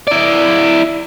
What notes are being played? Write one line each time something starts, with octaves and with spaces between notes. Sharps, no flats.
E4 D5